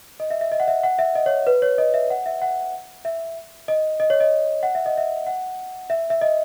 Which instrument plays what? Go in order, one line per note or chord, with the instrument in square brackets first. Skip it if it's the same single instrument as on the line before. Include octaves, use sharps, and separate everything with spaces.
[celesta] D#5
E5
E5
D#5
F#5
E5
F#5
E5
D#5
C#5
B4
C#5
D#5
E5
F#5
E5
F#5
E5
D#5
D#5
C#5
D#5
F#5
E5
D#5
E5
F#5
E5
E5
D#5